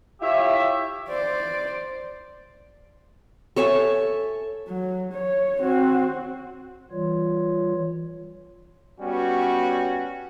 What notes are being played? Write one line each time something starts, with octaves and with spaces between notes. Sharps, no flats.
E4 F4 G4 C#5 E5
C5 D5
A4 C#5 E5 G#5
F#3
C#5
C4 F#4
E3 G3 F4 C#5
G3 B3 C#4 F#4